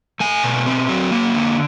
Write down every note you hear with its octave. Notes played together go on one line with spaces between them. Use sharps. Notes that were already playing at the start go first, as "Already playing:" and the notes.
A3 G#5
B2
C4
F#3
A#3
D3